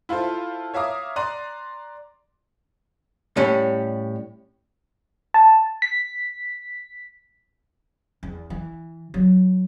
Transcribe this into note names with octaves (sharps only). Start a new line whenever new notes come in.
E4 F4 A4 C5
C#5 E5 F5 A#5 D6 D#6
D5 A#5 C6 F#6 D#7
A2 G3 C#4
A5
B6
E2
E3
F#3